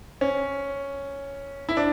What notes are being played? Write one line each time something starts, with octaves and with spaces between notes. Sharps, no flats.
C#4
E4
D4